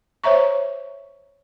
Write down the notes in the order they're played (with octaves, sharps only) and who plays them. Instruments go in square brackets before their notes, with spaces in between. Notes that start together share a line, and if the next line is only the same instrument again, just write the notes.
[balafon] C5 C#5 E5 A#5 C#6